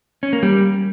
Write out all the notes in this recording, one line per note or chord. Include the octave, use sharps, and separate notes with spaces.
C#4
A#3
G3